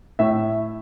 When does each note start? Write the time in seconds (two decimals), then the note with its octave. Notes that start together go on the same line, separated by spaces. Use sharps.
0.19 A2 E5